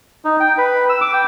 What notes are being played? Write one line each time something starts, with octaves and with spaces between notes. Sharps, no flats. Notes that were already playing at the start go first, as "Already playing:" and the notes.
D#4
G5
B4
E6
D6
G5